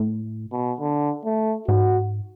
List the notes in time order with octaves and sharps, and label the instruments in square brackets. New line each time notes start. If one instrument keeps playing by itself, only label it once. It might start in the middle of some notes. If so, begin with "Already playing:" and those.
Already playing: [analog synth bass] A2
[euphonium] B2
D3
A3
[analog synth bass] G#2 [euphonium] F#4